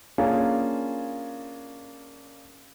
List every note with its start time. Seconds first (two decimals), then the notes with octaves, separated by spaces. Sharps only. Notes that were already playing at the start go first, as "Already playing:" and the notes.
0.18 A#3 C#4 D4 F4 G#4